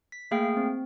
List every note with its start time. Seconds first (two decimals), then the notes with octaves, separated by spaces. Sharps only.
0.12 B6
0.31 A3 A#3 G#4 F5 G5
0.57 C4